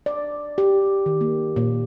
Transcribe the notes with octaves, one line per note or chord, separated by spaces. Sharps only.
D5
G4
D#3
A#3
A#2